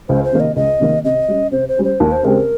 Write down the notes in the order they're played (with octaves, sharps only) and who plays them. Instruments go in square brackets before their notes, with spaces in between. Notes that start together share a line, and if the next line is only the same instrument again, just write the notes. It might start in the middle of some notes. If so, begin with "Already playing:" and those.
[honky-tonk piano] C#2 [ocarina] C5
[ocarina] C5
[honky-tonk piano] C3 D#3 A#3
[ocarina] D#5
[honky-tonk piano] C#2 [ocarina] D#5
[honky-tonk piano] C3 D#3 A#3
[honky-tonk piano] C3 [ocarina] D#5
[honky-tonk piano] G3 C#4
[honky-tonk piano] C3 [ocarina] C5
[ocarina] C5
[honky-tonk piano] G3 C#4
[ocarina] C5
[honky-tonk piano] D#2 [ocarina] A#4
[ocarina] C5
[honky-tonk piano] C#3 G#3 C4 G4 [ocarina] A#4